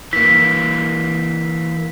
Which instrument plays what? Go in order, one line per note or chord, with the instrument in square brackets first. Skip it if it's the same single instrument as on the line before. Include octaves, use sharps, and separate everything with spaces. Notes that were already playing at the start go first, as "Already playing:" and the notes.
[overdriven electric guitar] E3 A#3 [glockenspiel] B6